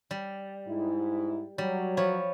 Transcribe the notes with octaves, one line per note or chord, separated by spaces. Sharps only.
G3
G#2 E4
F#3 G3
F3 C#5 B5